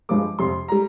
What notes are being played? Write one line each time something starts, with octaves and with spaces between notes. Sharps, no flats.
G2 F3 G#3 D6
F2 C3 G3 C6
G3 A#5